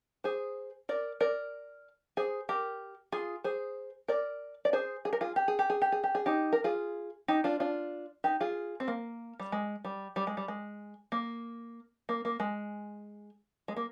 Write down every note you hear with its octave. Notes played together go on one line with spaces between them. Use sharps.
G#4 C5
A#4 D5
A#4 D5
G#4 C5
G4 A#4
F4 G#4
G#4 C5
A#4 D5
D5
G#4 C5
G#4
A#4
F4 G#4
G4
G#4
G4
G#4
G4
G#4
G4
G#4
D#4 G4
A#4
F4 G#4
D#4 G4
D4 F4
D4 F4
D#4 G4
F4 G#4
C4
A#3
G3
G#3
G3
G3
G#3
G3
G#3
A#3
A#3
A#3
G#3
G#3
A#3